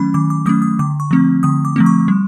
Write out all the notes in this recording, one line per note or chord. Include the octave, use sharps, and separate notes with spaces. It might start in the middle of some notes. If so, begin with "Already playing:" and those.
Already playing: D#3 F#3 A3 C#4 B5
D#3 D6
D6
F#3 A3 C#4 D#6
D#6
D3 D6
C#6
F3 A3 C4
D3 D#6
D6
F3 A3 C4
C#6
G3